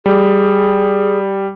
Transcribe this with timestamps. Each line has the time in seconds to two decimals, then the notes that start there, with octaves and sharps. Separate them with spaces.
0.06 G3 G#4